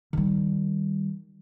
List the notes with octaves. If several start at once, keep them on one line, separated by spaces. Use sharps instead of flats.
D#3 G3